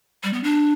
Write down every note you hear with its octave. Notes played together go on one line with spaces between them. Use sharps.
G3
B3
D4